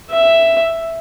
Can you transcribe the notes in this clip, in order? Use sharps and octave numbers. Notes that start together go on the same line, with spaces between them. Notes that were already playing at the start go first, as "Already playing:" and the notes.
E5